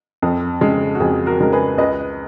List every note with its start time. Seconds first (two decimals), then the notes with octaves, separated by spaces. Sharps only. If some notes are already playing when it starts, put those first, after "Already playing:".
0.22 F2
0.61 C#3 G#3
0.95 F#4
1.00 F2 G#4
1.26 F#4 A#4
1.40 C#3 G#3 A#4
1.53 G#4 B4
1.78 C#2 B4 D#5